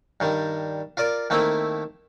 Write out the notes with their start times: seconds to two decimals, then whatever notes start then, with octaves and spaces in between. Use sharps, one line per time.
0.20 G2 D#3 G3
0.97 F4 A#4 D5 D6
1.30 D#3 A3 A#3 C4 E4